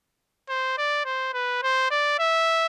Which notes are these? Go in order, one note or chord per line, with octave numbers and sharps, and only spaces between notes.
C5
D5
C5
B4
C5
D5
E5